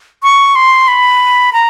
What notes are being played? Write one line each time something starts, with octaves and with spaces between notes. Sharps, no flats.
C#6
C6
B5
A#5